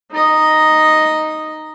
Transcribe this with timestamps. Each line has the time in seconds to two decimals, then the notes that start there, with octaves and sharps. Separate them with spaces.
0.11 D#4 D#5